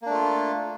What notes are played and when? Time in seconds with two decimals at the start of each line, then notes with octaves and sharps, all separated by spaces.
0.02 A#3
0.06 D4
0.10 A3
0.14 F4